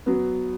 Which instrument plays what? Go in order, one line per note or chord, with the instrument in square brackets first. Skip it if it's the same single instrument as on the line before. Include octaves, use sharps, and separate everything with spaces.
[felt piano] F#3 B3